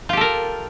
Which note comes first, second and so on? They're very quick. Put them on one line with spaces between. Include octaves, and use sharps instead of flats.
F4 G4 A4 A#4